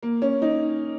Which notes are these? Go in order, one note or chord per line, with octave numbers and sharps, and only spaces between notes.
A#3
C#4
D#4